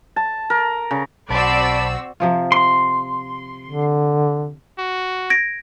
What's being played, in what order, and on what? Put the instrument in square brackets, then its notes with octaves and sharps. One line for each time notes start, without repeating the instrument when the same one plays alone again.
[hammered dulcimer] A5
A#4
C#3
[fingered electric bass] B1 [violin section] C4 F#4 E6 [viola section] D5 [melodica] A5 B5
[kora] C3 F3 F4
[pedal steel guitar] C6
[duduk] D3
[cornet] F#4
[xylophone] G#6 A#6 D7